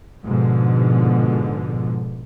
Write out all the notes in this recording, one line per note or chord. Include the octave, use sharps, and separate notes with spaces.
G#2 B2 D3 F3